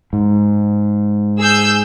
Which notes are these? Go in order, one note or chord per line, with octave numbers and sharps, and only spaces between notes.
G#2
G#4 E6 G6